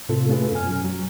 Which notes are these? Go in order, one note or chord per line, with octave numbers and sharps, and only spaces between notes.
A2 C3 F4 A4
A3 C#4 F4 G#4 A4 B4
F#2 B2 C#4 G#5 F6
F#3
F#3